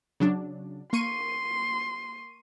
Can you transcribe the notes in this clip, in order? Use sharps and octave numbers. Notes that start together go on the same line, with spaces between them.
C#3 F#3 D4
A#3 C6 C#6 D#7